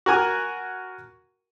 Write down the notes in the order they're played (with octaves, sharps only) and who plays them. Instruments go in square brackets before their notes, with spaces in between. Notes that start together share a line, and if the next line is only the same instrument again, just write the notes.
[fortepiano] F#4 A#4 G#5